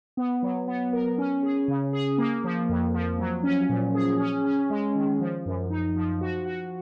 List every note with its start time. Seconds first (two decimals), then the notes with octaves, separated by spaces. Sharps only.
0.17 B3
0.43 F#3
0.67 B3
0.93 A#4
1.18 C#4
1.43 G#4
1.68 C#3
1.93 G#4
2.18 A#3
2.44 F3
2.69 F2
2.94 F3
3.19 F#3
3.43 C#4
3.69 A#2
3.95 G#4
4.20 C#4
4.45 C#4
4.70 G#3
4.95 D#3
5.20 F3
5.46 F#2
5.70 D#4
5.96 F3
6.21 F#4
6.46 F#4